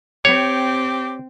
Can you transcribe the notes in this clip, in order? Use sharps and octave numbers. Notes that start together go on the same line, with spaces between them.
C4 G4 C#5